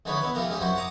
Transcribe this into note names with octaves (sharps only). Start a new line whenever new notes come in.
D3 E3 G#3 D#4 B4 C#5
B3 E4 B4
E3 F4 G4 A4 A#4 D#5
G#3 C#4 D#4 G4 G#4
F#2 E4 F#4 C5
F#5 A5 A#5 D6 D#6